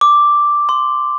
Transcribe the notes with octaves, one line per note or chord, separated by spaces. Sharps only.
D6
C6